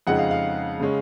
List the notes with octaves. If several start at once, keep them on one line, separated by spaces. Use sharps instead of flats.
F2 C#3 G#3 D#4 F#5
F5
F5
C#3 G#3 C#4